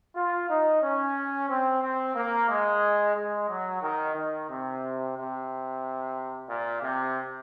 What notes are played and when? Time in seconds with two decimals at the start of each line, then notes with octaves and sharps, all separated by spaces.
0.15 F4
0.49 D#4
0.82 C#4
1.49 C4
1.83 C4
2.15 A#3
2.49 G#3
3.15 G#3
3.48 F#3
3.81 D#3
4.15 D#3
4.49 C3
5.15 C3
6.49 A#2
6.82 C3